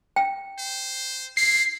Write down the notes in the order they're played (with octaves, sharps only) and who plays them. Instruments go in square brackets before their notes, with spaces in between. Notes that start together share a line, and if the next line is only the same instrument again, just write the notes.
[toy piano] G5
[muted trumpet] C5
[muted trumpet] E4 [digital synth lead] C7